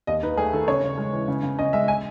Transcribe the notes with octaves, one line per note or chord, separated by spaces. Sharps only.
D#2 D#5
D#4 B4
A3 G#4
D#3 A4
C#3 C#5
C#3
G#3
E3
C#3
C#3
C#4 D#5
G#3 E5
G#5